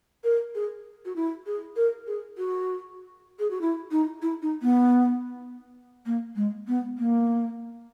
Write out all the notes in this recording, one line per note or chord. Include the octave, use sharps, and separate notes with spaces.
A#4
G#4
F#4
E4
G#4
A#4
G#4
F#4
G#4
F#4
E4
D#4
E4
D#4
B3
A#3
G#3
B3
A#3